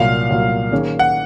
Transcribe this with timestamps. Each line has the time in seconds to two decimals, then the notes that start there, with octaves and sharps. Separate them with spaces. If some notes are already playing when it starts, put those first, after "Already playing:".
Already playing: C2 A#2 F#3 F5
0.30 C2 A#2 F#3
0.72 D#3 A#3 C#4 G#4
0.99 F#5